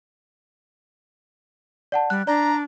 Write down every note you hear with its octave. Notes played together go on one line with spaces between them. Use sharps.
D5 F#5 A5
G3 F#6
D4 D5 A#5